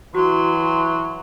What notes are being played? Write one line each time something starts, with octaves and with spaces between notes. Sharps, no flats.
E3 F#3 F#4 C6